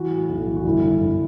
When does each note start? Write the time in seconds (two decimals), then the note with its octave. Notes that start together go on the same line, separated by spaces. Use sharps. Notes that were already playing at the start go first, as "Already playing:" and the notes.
Already playing: E3 F#4
0.11 A2
0.29 B1
0.47 E3
0.57 F#4
0.64 G1 E4
0.83 G1
1.00 G1